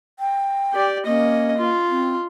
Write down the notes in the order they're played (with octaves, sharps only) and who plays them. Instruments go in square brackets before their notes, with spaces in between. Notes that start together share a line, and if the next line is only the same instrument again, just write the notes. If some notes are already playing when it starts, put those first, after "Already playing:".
[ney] G5
[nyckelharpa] G4 D5
[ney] A#3 [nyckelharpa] C#4 D#5
[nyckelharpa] F4
[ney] C4